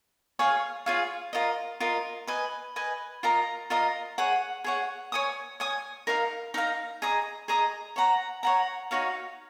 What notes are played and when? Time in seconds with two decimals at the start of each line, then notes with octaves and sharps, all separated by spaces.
0.39 F4 G#4 C#5 F5
0.86 F4 G#4 C#5 F5
1.33 F4 A#4 D#5
1.80 F4 A#4 D#5
2.27 B4 D#5 G#5
2.76 B4 D#5 G#5
3.23 F4 A#4 D#5 A#5
3.70 F4 A#4 D#5 A#5
4.18 G#4 C#5 F#5
4.64 G#4 C#5 F#5
5.12 C#5 G#5 D#6
5.60 C#5 G#5 D#6
6.07 D#4 A#4 F5 A#5
6.54 D#4 A#4 F5 A#5
7.02 G#4 D#5 A#5 D#6
7.48 G#4 D#5 A#5 D#6
7.96 C#5 F#5 A#5
8.43 C#5 F#5 A#5
8.91 D#4 F#4 C#5 F5